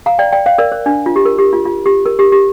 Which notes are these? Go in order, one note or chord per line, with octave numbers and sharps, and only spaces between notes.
F5 A#5
D5 G5
D5 G5
C5 F5
A#4 D5
C5
D4
F4
G4
A#4
G4
F4
F4
G4
A#4
G4
G4